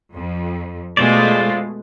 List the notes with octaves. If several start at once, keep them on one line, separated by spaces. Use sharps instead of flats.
F2
B2 G#3 A3 F4 C5 D5